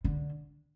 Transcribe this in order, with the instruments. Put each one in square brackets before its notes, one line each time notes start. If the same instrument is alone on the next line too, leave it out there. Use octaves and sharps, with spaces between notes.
[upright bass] D3